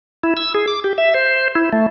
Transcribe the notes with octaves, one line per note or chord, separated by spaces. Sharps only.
E4
E6
G#4
D6
G4
E5
C5
E4
A3